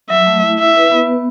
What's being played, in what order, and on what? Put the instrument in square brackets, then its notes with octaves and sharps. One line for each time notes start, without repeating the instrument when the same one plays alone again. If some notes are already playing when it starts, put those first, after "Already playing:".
[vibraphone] F#3 [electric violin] E5
[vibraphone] A3
E4
[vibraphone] E4 [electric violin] E5
[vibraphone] B4
B3
B3